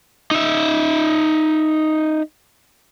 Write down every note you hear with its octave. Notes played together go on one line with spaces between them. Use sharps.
D#4 E5